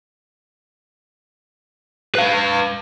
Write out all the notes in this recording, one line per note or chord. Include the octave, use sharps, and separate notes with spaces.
B4 F5